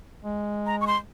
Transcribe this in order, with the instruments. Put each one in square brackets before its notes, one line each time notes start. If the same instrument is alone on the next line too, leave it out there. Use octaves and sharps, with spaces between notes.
[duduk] G#3
[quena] A#5
C#6
C6